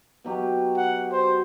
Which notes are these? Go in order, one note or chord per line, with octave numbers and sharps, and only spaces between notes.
B2 F#3 G4
F#5
C5